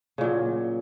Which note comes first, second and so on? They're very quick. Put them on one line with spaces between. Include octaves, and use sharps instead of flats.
C#3 A#2 F#3